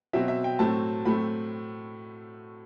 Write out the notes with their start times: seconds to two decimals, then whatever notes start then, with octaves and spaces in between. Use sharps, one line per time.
0.13 B2 F#3 C4 E5
0.28 E5
0.44 G5
0.59 A2 F#3 A3 C4 A5
1.05 A2 F#3 A3 C4 B5